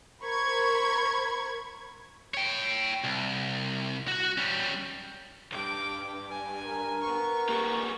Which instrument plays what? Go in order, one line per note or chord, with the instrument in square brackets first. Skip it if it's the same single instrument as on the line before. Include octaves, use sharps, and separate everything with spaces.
[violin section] A#4 C5 B5 C#6 G#6
[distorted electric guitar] C#5 G5
C2
F#4 F#5
G3 C#4
[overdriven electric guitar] B1 G2 [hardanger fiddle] G5 D6
[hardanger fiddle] G#5
[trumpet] A#4
[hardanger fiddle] B3 C#6
[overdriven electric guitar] G3 A#3